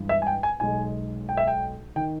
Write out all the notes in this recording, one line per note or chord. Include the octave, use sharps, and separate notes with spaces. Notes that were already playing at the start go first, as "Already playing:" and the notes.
Already playing: G2 E3 G#3
E5
G#5
G5
G#5
B1 B2 G#3 G#5
G5
E5
G5
D#3 G5